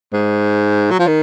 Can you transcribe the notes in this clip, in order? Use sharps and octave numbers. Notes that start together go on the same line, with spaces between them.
G#2
F#3
F3
D#3